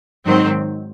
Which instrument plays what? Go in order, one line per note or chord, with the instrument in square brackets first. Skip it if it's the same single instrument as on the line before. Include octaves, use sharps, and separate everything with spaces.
[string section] G#2 D#3 F#3 C4